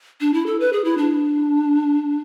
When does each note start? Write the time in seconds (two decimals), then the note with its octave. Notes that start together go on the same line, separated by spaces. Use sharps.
0.21 D4
0.34 E4
0.46 A4
0.60 B4
0.73 G#4
0.85 E4
0.98 D4